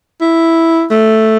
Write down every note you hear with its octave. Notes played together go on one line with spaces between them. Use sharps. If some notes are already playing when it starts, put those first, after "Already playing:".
E4
A3